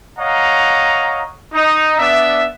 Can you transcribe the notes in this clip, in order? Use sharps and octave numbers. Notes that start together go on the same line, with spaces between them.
C#5 D#5 F5 F#5 A#5
D#4
B3 D4 D5 E5